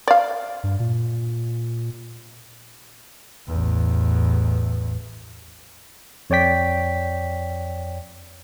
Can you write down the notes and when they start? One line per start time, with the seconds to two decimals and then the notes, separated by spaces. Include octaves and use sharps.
0.08 D5 F5
0.63 G2
0.80 A#2
3.47 A1 E2
6.30 F2 C#5 D5 G5 B6